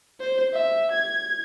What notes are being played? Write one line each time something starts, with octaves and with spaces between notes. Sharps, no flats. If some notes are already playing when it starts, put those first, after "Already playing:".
C5
E5
G#6